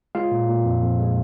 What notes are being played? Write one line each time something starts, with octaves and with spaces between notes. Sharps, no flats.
G#3 F4 F5
A#2
A#2
F2
F2
G#3